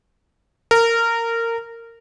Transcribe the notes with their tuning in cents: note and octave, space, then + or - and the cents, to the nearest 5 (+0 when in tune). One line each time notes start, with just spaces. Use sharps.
A#4 -20